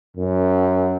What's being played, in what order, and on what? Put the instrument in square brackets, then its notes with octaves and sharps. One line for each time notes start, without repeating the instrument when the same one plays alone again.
[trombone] F#2